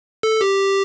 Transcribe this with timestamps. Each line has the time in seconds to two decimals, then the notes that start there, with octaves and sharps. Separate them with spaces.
0.23 A4
0.41 G4